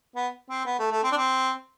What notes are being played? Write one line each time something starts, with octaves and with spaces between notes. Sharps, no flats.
B3
C4
B3
A3
A3
C4
D4
C4